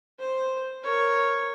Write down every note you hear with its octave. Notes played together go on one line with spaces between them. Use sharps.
C5
A#4 C#5